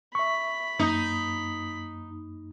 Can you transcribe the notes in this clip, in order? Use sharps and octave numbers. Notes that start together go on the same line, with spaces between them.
E5 B5 C#6
F#2 A#3 D#4 D#6